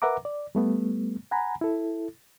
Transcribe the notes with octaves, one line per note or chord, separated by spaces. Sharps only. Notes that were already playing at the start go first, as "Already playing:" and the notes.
A#4 B4 E5 F#5 A#5 D6
D5
G3 A3 B3
F#5 G#5 A#5 B5
E4 A4